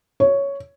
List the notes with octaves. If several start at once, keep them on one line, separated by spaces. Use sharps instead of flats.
C#5